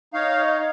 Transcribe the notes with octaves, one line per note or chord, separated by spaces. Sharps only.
D#4 C#5 F5